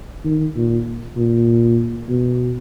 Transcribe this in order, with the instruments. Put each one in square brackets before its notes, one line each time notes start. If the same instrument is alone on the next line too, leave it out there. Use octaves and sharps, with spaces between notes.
[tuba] D#3
A#2
A#2
B2